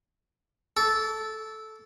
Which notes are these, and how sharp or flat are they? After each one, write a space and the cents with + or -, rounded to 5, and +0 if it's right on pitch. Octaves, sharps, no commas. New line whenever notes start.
A4 -10 D6 -40